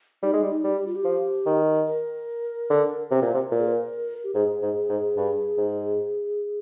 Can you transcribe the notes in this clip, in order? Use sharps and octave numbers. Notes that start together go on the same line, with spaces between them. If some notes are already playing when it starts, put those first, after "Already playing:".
G3 D#4
G#3
G3
D#4
G3
G4
F4
G4
F3
D#3
A#4
D3
C3
A#2
C3
A#2 A#4
G#4
C5
A#4
G4
G#2 G#4
G#2
G#2
G2
G#2